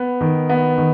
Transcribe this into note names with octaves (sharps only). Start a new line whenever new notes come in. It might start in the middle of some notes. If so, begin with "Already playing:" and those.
Already playing: B3
D#3
B3
D#3